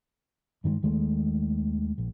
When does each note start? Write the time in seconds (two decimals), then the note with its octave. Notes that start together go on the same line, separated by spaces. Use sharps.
0.64 G2 D#3 F#3 G#3
0.83 D#2 D#3 G#3 A3
1.98 A#1